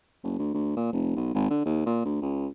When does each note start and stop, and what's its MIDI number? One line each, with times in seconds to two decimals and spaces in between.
0.24 0.37 30
0.39 0.52 38
0.54 0.76 38
0.76 0.88 46
0.92 1.15 29
1.16 1.33 35
1.35 1.50 32
1.50 1.64 50
1.66 1.85 39
1.86 2.01 46
2.05 2.17 38
2.22 2.47 37